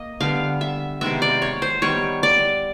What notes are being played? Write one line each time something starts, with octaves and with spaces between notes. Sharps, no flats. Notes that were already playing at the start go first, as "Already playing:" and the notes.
Already playing: A#3 D#5
D3 G3 B3 F5
E5
C3 D#3 G#3 B3 E5
D5
C#5
C5
D#3 G3 B3 C#5
D5